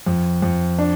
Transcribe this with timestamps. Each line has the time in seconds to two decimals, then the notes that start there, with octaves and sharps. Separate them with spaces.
0.07 F2
0.42 F2
0.79 D4